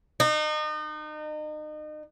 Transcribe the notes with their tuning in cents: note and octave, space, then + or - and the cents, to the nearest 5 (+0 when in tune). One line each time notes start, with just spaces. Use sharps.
D#4 -35